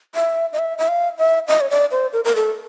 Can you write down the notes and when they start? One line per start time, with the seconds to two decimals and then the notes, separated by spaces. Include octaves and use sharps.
0.15 E5
0.53 D#5
0.59 E5
0.78 E5
0.88 F5
1.18 E5
1.48 D#5
1.61 C#5
1.70 D5
1.91 C5
2.13 A#4
2.25 A#4
2.36 A4